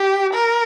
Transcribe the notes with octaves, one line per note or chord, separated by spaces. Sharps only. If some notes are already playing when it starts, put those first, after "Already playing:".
Already playing: G4
A#4